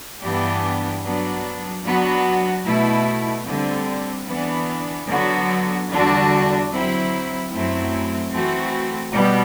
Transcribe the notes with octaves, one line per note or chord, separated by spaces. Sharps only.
G2 E3 B3 D4 G4
F#3 B3 D4
F#3 B3 D4 F#4
B2 A3 E4
D3 G3 C4
E3 B3 D4
D3 F#3 B3 F#4
E2 D3 G3 D4 F#4
F#3 C4 E4
F#2 F#3 A3 C4 E4
E3 A3 C4 F#4
B2 G3 B3